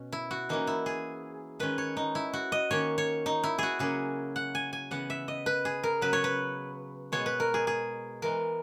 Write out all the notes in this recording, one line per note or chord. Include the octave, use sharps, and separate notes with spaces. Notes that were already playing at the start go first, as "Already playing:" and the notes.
Already playing: B2 C#4
E4
F#4
E3 A#3 C#4 D#4
E4
G#4
D#3 G#3 C#4 B4
C#5
D#4
E4
F#4
D#5
D#3 A#3 C#4 C#5
C#5
D#4
E4
F#4 G#4
C#3 F#3 A#3 C#4 G#4
F#5
G#5
G#5
C#3 E3 B3 F#5
E5
D#5
B4
G#4
A#4
C#3 F#3 B3 B4
C#5
B4
B2 G#3 B3 C#5
B4
A#4
G#4
G#4
E3 G#3 B3 A#4